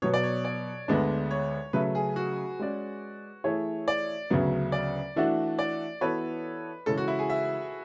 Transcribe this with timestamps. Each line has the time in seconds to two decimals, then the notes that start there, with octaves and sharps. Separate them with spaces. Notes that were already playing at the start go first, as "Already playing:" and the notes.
0.02 B2 F#3 B3 C#5
0.14 D5
0.23 C#5
0.45 D5
0.88 D2 D3 G#3 B3 D4
1.31 C#5
1.73 C#3 F#3 A3 B4
1.95 G#4
2.16 F#4
2.59 G#3 C#4 G#4 D5
3.44 E3 A3 E4 G#4 C#5
3.88 D5
4.30 D2 C#3 F#3 B3
4.72 D5
5.16 E3 A3 D4 F#4
5.59 D5
6.01 E3 B3 F#4 A4 B4 C#5
6.86 C#3 E3 G#3 C#4 A4
6.98 F#4
7.08 E4
7.19 G#4
7.30 E5